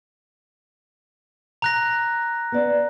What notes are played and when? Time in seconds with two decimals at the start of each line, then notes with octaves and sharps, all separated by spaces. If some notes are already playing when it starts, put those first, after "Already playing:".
1.62 A#5 F#6 A#6
2.52 B3 D5